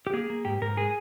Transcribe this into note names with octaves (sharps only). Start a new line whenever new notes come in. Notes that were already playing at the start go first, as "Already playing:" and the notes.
G4
A#3 G#4
A#3
G#2 G4
G#2 A#4
G#3 G#4